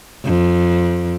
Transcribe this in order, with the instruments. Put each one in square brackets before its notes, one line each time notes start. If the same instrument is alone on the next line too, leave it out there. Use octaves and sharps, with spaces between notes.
[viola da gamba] F2